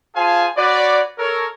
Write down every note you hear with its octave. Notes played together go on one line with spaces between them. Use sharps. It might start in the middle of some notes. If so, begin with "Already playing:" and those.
F4 G#4 C5 F5 G#5 A5
F#4 B4 C#5 D5
A4 A#4 C#5